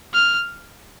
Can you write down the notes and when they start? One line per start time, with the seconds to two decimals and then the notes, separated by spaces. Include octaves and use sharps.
0.14 F6